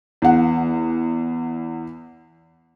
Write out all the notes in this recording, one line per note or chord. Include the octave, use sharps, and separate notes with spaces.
E2 F#5